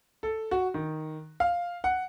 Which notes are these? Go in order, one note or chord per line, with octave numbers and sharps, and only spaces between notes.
A4
F#4
D#3
F5
F#5